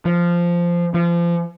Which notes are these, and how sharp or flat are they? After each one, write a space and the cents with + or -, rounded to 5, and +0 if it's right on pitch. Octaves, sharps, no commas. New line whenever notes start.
F3 -10
F3 -30